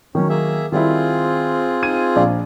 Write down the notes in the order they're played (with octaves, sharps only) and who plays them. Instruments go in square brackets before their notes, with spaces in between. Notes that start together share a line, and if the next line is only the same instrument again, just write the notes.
[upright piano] D#3 F#3 [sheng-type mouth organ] C#4
[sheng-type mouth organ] A#3 G#4 E5
[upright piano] D#3 G3 E4 [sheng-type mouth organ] C4 F4 G#4
[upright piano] D#4 G#6 D#7
A#1 D5 F5